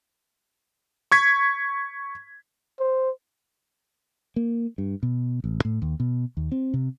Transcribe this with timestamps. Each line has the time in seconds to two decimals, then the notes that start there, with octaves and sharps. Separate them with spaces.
1.12 C#6 G#6 B6
2.80 C5
4.36 A#3
4.78 G2
5.03 B2
5.44 A1
5.65 A2
5.82 D#2
6.00 B2
6.37 D#2
6.52 C4
6.74 C3